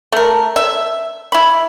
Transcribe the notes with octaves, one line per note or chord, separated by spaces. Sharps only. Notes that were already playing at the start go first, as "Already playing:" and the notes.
A3 A#4
E5
E4 B5